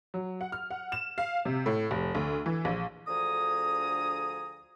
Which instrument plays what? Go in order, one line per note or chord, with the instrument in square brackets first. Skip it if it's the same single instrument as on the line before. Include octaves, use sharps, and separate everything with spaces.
[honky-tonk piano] F#3
F#5
F6
F#5
E7
F5
C3
A2
F1
D2
E3
A#1
[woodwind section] D2 D3 F3 G#4 A#5 D#6